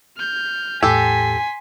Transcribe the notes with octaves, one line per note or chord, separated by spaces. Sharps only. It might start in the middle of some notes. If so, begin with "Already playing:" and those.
F6 G6
E2 A2 G4 A4 G#5 C6 B6